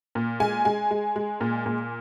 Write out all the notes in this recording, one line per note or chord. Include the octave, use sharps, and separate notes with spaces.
A#2
G#3 G#5
G#3 G#5
G#3
G#3
A#2
A#2